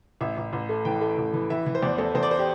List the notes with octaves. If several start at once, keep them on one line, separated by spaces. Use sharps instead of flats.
A1 E5
A1
A1
A3
E3 G5
A3
A1
E3
E3 E5
E3
C5
E2 D5
E2 A4
E2 C5
D5
C5
G4